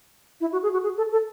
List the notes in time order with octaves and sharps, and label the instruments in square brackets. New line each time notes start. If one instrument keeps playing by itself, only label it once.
[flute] E4
F#4
G#4
F#4
G#4
A4
A4